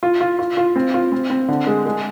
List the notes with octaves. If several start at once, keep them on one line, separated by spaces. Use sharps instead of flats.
F4
F4
F4
F4
C4
F4
C4
C4
D3
G#3
G#3